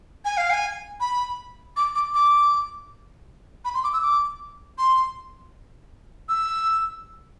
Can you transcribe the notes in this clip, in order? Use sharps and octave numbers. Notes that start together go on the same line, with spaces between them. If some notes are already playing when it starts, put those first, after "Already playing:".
G#5
F5
G#5
B5
D6
D6
D6
B5
C6
D6
E6
D6
C6
E6